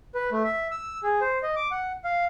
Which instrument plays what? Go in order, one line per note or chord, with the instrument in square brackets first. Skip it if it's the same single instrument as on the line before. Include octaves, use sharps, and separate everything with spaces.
[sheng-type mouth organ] B4
A3
E5
E6
G#4
C5
D#5
D6
F#5
F5